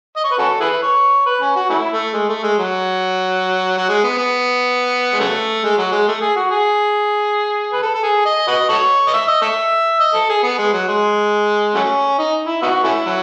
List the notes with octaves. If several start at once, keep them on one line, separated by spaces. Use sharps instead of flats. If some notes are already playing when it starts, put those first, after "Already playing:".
D#5
C#5
B4
C#4 F#4 A4
E4 G#4 B4
C#5
B4
C#4
F#4
A3 C#4 E4
A3
G#3
A3
G#3
F#3
F#3
G#3
B3
B3
G#3
C#3 F#3 A3
G#3
F#3
G#3
A3
G#4
F#4
G#4
B4
A4
A4
G#4
D#5
F#4 B4 D#5
F#4 A4 C#5
D#5
E5
D#5
A4 C#5 E5
D#5
A4
G#4
B3
G#3
F#3
G#3
F#3 A3 C#4
D#4
E4
B3 D#4 F#4
A3 C#4 E4
F#3